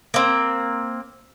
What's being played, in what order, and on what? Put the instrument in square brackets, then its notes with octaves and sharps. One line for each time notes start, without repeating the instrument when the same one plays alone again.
[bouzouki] A#3 C4